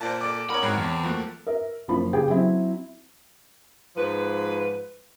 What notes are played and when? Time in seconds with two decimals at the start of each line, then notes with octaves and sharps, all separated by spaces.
0.01 A#2 C5 D5 A5
0.21 A4 D5 D6
0.50 B3 C#4 D#4 A#4 C#5 B5
0.63 G#2 C4 D#4 E4 F#4
0.77 E2 A5
1.03 F3 A3 A#3 F#4
1.47 A#4 E5
1.88 F#1 F3 B5
2.13 C#3 G4 G#4 G5
2.30 F#3 C4 E4
3.96 G#2 F3 B4